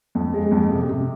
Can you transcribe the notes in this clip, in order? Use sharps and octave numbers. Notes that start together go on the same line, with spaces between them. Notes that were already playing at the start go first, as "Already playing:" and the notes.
F2
G#3
F2
C3
C3